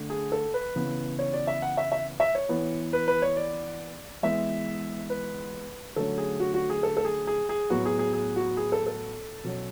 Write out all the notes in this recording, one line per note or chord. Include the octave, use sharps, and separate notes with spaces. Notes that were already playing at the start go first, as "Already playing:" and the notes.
Already playing: D3 A3
G#4
A4
B4
C#3 E3 B3
C#5
D5
E5
F#5
E5
E5
E5
C#5
E3 B3
B4
B4
C#5
D5
E3 G#3 B3 E5
B4
D3 F#3 A3 C#4 A4
G#4
F#4
F#4
G#4
A4
A4
G#4
G#4
G#4
A2 F#3 B3 F#4
G#4
G#4
G#4
F#4
G#4
A4
A4
B2 F#3 C#4